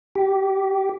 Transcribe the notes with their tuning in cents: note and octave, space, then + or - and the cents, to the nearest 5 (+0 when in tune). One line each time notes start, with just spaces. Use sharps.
G4 -15